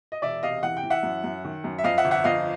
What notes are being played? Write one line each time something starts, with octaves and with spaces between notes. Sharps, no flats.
D#5
E1 D5 E5
C3 D#5 F5
E3 F#5
G5
E3
E5 F#5
F#2
F#2
D#3
F#2
E5
F2 D#5 F5
E5 F#5
G1
E5 F#5
F2 D#5 F5